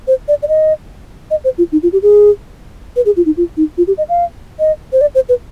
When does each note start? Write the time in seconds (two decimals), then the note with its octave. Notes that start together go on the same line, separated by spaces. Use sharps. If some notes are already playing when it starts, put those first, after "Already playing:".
0.07 C5
0.28 D5
0.43 D5
0.48 D#5
1.31 D#5
1.44 C5
1.58 F4
1.72 D#4
1.83 F4
1.93 G4
2.02 G#4
2.96 B4
3.06 G#4
3.17 F4
3.26 D#4
3.37 F4
3.57 D#4
3.78 F4
3.87 G4
3.98 D#5
4.09 F5
4.59 D#5
4.93 C5
5.01 D5
5.15 C5
5.29 B4